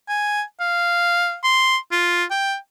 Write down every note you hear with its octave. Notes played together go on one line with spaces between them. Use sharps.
G#5
F5
C6
F4
G5